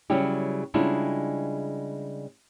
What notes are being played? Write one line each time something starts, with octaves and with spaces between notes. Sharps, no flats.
C#3 F#3 G3 E4 G4
C#3 G3 G#3 D4 E4 F4